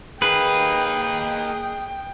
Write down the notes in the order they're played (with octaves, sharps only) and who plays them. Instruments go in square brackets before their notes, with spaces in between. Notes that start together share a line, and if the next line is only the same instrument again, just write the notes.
[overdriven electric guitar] A#3 D#4 [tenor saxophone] G#4 [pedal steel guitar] B4 [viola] G5